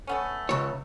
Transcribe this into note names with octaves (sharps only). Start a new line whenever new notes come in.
A3 B3 C#4
C#2 C#5